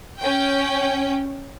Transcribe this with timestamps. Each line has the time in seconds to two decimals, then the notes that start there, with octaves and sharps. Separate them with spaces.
0.20 C#4 G5